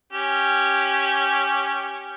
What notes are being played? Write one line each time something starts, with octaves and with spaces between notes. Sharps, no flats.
C#4 G4